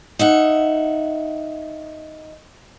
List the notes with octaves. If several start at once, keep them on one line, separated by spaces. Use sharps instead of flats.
D#4 E5 F#5